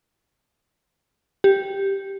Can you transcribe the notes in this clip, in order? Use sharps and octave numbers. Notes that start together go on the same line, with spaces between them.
G4